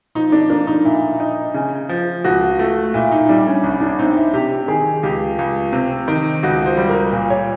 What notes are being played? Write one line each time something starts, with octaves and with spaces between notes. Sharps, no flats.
F3 D#4
D4
A#3 D4
D#4
A#2 E4
D#4
C#3
F3
C#2 F#4
A3
A#2 E4
D#4
G3 D4
C#4
C2
D4
C4 D#4
E4
C3 G4
D#3 G#4
C#2 G4
C#2
C3
D#3
C#2 F#4
C5
G3
A#4
A#2
C#5